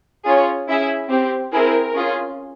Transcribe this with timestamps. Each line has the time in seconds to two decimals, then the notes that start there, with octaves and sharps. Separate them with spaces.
0.26 C#4 F4 G#4 C#5
0.68 C#4 E4 G#4 E5
1.10 C4 G4
1.52 C4 E4 G#4 A#4
1.94 C#4 F4 G#4